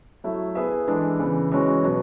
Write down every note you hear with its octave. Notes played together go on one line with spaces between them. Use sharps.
F#3 A3 E4
B3 E4 G#4 B4 E5
E3 G#3 D4 A4
C#3 E3 B3
E3 G#3 C#4 F#4
B2 F#3 B3